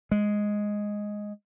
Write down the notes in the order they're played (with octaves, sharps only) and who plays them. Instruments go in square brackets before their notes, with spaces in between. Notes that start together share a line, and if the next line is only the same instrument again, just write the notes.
[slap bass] G#3